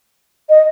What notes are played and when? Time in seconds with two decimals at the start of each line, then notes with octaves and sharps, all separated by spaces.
0.50 D#5